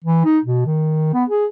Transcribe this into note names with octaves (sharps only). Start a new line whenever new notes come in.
E3
D#4
B2
D#3
B3
G#4